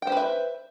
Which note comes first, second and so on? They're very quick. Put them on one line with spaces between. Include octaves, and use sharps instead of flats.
G5 C5 B4 E5